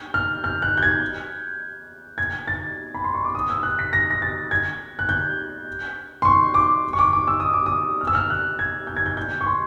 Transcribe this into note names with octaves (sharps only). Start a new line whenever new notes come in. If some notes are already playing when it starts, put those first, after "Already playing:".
Already playing: G6
F6
F6
F#6
G6
G#6
G#6
A6
B5
C6
C#6
D6
D#6
E6
F#6
B6
A#6
A#6
A6
G#6
F#6
G6
C6
C#6
D6
C#6
D6
D6
E6
D#6
D6
D#6
F6
E6
F6
F#6
G#6
G6
G#6
G6
G6
C#6
C6